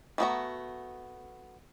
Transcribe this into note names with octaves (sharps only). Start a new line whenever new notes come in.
E3 A3 B3 F#4 A#5